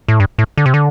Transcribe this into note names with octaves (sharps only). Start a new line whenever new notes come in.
A2
G2
A2
D3
C3
D3